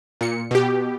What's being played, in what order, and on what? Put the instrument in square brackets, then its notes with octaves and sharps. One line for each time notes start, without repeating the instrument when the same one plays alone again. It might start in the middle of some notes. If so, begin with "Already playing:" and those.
[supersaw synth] A#2 C#7
B2 G4